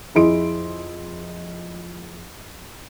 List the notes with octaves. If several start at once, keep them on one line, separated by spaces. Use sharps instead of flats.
F2 E4 G#4 D#5 C6 D7